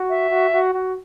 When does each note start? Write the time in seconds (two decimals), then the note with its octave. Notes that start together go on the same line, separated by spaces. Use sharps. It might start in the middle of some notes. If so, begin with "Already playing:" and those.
Already playing: F#4
0.09 E5
0.31 F#4
0.52 F#4
0.74 F#4